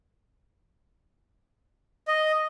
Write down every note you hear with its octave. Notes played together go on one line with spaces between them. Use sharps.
D#5